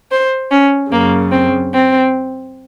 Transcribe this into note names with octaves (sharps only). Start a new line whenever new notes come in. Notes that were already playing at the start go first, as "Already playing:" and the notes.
C5
C#4
F#2 C#3 A#3
C4
C4